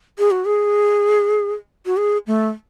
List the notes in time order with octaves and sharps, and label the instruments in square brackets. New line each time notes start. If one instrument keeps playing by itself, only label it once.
[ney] G#4
F#4
G#4
F#4
G#4
A3